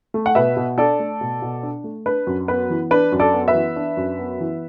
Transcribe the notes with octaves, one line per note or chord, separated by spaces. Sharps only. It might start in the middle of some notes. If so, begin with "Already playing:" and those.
A3
F#5
B2 B4 E5
B2
D4 A4 D5
A3
B2
B2
D4
A3
D4 B4
F#2
B3 B4
E3
D4 B4
F#2
A4 D5
B3
B4 E5
E3
D4
F#2
B3
E3